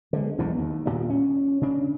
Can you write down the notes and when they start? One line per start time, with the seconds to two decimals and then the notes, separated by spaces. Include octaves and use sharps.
0.13 D3 G#3
0.38 B1 E2 G#2 B2
0.58 D#2
0.86 A#2 G3
1.10 C#4
1.61 C#3 D4